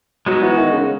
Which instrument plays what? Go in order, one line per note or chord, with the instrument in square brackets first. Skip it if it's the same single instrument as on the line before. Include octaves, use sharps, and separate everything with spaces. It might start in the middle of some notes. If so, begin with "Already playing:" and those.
[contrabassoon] F#3 [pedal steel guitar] G#3 B3 D#4 F#4
[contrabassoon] E3
D#3
C#3